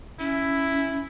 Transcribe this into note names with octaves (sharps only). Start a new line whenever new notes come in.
C#4 E4